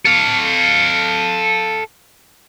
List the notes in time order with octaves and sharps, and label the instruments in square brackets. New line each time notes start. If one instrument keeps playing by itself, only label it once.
[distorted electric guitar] A4 F5